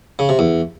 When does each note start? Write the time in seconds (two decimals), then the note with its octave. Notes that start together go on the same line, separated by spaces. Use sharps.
0.19 C#3
0.29 C3
0.39 E2